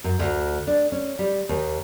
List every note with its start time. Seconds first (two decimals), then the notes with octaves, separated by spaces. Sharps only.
0.04 F#2
0.19 D2
0.67 D4
0.92 C#4
1.19 G3
1.49 D#2